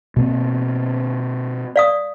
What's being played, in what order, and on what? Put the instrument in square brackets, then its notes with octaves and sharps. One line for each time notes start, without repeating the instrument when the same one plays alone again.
[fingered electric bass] B2 A#3 C4
[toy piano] D5 F5 D#6